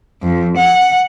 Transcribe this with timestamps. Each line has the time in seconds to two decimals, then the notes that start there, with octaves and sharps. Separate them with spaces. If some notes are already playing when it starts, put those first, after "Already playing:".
0.23 F2
0.57 F#5